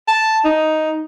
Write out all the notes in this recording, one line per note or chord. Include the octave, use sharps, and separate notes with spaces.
A5
D#4